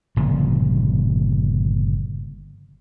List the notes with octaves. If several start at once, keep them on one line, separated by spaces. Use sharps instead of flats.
G1 A#2 C#3 F3